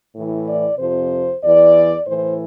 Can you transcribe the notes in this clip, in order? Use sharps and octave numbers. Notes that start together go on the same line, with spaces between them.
A2 E3
D5
F2 C3 F3 C5
E2 E3 D5
A2 E3 C5